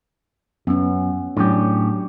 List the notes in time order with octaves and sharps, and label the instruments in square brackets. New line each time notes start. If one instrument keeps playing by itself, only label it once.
[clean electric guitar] F#2 [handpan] B3 C#4
[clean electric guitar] A2 C#4 G4 [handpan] F#3 D4